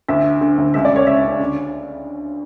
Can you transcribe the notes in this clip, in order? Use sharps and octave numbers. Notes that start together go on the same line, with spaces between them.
D2 E5
D3
D3
D2
C#2 E5
D5
C#2
C#5
C#3 E5
C#3
D3